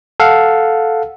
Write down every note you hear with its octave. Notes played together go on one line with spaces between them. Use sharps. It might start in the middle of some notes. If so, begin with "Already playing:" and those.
A4 F5 F#5